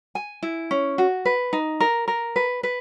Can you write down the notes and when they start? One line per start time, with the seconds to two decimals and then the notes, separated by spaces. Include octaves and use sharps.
0.15 G#5
0.43 E4
0.71 C#4
0.98 F#4
1.25 B4
1.53 D#4
1.80 A#4
2.08 A#4
2.36 B4
2.63 B4